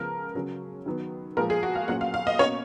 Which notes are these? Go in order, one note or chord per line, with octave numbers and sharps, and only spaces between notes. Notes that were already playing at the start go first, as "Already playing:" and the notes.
Already playing: C#3 F3 G#3 B3 A#4
C#3 F#3 C#4
D#3 F#3 B3
A#2 F3 G#3 A#4
G#4
F#4
F5
A#2 F#3 C#4 F#5
F5
F5
D#5
B2 A#3 C#4 C#5